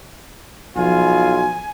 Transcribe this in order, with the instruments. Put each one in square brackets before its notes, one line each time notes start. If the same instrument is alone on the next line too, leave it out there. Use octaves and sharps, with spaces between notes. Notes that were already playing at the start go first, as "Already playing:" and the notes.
[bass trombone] B1 [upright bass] F3 [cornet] F4 [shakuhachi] G#5